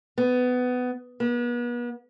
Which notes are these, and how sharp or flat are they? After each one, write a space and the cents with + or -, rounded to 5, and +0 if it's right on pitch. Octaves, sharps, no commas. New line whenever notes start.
B3 +15
B3 -40